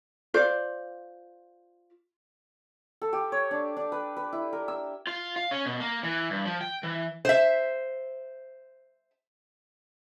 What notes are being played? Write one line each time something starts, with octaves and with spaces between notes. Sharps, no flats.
F4 C5 D5
A4
G4
C#5
D4
D4
B4
B4
E4
A#4
E6
F4
F5
C#4
B2
A#3
E3
G2
F3
G5
E3
C5 E5